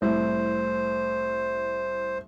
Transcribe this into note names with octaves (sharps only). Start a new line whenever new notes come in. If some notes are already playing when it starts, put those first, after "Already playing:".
C2 A2 E4 C5